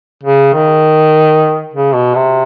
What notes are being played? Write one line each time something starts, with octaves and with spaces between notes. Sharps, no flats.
C#3
D#3
C#3
B2
C3